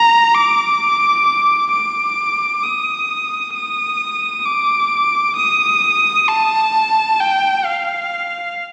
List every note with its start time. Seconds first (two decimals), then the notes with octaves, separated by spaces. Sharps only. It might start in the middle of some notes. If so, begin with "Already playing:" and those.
Already playing: A#5
0.35 D6
1.72 D6
2.64 D#6
3.54 D#6
4.46 D6
5.36 D#6
6.28 A5
7.20 G5
7.65 F5